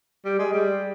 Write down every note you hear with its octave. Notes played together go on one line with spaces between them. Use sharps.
G3
G#3
G3